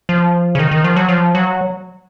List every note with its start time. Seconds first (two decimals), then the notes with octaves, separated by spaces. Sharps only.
0.09 F3
0.55 C#3
0.59 D#3
0.71 D#3
0.84 F3
0.96 F#3
1.08 F3
1.35 F#3